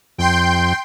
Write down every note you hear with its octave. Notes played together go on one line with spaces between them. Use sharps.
F2 G5 C6 G6